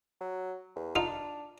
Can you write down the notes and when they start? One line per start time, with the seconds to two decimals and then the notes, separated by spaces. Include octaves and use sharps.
0.21 F#3
0.76 E2
0.96 D4 D#4 F4